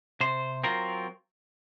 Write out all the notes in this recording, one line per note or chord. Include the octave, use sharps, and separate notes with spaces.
C3 C5
F#3 C4 F4 A#4